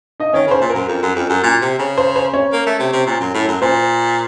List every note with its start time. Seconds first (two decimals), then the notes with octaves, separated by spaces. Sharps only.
0.20 D#4 D#5
0.33 D#3 C#4 C#5
0.47 C#3 C5
0.61 A#2
0.70 A#4
0.75 F#2
0.88 F2
1.02 F#2
1.16 F2
1.29 F#2
1.43 A#2
1.61 C3
1.79 C#3
1.98 C5
2.16 C5
2.34 C#4 C#5
2.52 A#3
2.66 A3
2.79 C3
2.93 C3
3.07 A#2
3.20 F#2
3.34 A2
3.48 F#2
3.62 A#2 C5